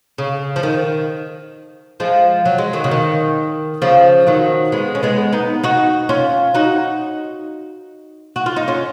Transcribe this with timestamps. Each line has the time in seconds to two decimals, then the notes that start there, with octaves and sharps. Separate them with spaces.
0.18 C#3
0.56 F3
0.63 D#3
2.00 F3 G#3
2.46 F#3
2.58 G#3
2.73 D#3 F#3
2.84 C#3
2.91 D#3
3.82 C#3 F3
4.27 D#3 F#3
4.72 G#3 B3
4.95 C#4
5.03 G#3 B3
5.33 B3 D#4
5.64 D#4 F#4
6.09 C#4 F4
6.54 D#4 F#4
8.36 F#4
8.46 F4
8.56 D#4
8.68 C#4 F4